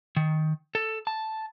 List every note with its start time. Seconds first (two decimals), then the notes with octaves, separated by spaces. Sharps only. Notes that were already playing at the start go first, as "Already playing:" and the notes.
0.16 D#3
0.75 A4
1.07 A5